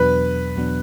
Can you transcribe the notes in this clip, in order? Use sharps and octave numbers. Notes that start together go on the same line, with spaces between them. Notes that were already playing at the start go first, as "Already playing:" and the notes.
Already playing: E2 B2 F#3 B3 D4 B4
E2 B2 F#3 B3 D4